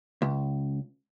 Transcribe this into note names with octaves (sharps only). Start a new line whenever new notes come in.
C#2